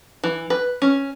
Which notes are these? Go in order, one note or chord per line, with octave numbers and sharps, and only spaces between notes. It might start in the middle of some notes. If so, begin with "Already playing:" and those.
E3
B4
C#4